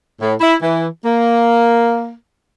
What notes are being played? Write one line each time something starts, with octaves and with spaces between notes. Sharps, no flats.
A2
E4
E3
A#3